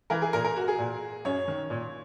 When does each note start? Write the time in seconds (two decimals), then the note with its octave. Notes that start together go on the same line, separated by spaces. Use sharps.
0.10 E3 A#4
0.22 G#4
0.33 A#2 A#4
0.45 A#4
0.56 F#4
0.68 G#4
0.79 A#2
1.25 F#2 C#5
1.48 D#3
1.70 A#2